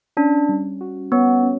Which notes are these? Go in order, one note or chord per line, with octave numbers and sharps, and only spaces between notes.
C#4 D4
G3
F#4
B3 C#5
C#4